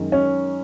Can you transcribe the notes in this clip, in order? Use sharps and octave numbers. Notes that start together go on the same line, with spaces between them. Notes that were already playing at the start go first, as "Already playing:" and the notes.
Already playing: F#2 D#3 G#3
C#4